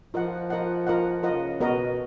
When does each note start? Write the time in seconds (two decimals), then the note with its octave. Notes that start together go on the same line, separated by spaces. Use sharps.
0.13 F3 F4 A#4 D#5 F#5
0.50 F4 A#4 D#5 F#5
0.87 F4 A#4 D#5 F#5
1.23 C#3 F4 A#4 D#5 F#5
1.59 B2 B3 F#4 A#4 D#5